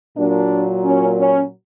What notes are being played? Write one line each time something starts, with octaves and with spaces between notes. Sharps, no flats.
A#2 F#3 D4
C#4
C#4